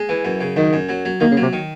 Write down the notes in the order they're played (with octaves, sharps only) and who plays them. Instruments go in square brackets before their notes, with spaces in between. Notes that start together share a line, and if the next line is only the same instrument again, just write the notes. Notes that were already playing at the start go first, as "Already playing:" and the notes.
Already playing: [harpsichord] G#3
E3
F#2
C#3
[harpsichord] F#2 [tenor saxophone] D#3
[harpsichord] F#2
F#3
F#3
[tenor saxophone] D#3 [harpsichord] A#3
[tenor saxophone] C#3
[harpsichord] F#3
[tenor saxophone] C3
[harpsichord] D#3